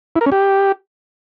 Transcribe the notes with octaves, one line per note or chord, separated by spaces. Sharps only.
E4
A#4
C#4
G4